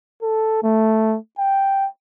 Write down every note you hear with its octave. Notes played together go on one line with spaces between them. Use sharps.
A4
A3
G5